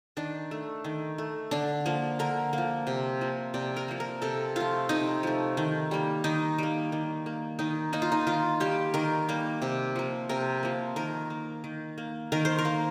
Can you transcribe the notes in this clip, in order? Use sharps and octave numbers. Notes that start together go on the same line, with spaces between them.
D#3 D4
A3
D#3
A3
D3 D4
F3 A#3
D3 A#4
F3 A#3
C3
F3 A#3
C3 D5
A#4
F3 A#3
A#4
C3 A4
F3 A3 F4
C3 D#4
F3 A3
D#3
G3 A#3
D#3 D#4
G3 A#3
D#3
A#3
D#3 D#4
A#3 D#4
F4
D#4
D#3 F4
G3 A#3 G4
D#3 A#4
G3 A#3
C3
F3 A#3
C3 A#4
F3 A#3
D#3 A#4
A#3
D#3
A#3
D#3 A#4
C5
A#4
A#3